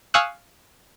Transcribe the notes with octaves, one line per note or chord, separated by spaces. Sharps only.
F5 G#5 C#6 D#6 E6 F#6